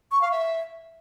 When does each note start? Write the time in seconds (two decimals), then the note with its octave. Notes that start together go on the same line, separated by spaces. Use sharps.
0.12 C#6
0.21 F5
0.31 E5